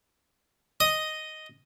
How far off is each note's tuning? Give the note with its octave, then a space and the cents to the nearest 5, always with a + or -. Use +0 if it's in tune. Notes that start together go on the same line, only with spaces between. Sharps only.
D#5 +0 D#6 +0